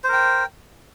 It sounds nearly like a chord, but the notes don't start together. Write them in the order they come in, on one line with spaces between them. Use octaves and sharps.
C5 A#4 G5